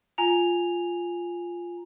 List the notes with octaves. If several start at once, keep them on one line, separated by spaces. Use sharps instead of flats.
F4 G#5 A#5 F7